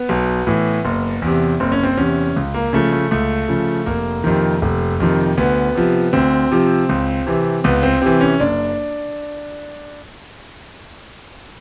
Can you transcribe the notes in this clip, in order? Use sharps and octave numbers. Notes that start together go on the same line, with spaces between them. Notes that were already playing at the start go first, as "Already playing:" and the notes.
Already playing: B3
B1
A2 E3
F#1
E2 C3
F#1 C4
C#4
C4
E2 C3 C#4
C#2
A#3
C#3 F3 A3
A3
C#2 A3
C#3 F3
F1 A#3
F2 C3 D#3
F1
F2 C3 D#3
D2 B3
C3 F3
D2 C4
C3 F3
C#2
C3 E3
C#2 B3
C4
C3 E3 C4
C#4
F#1 D4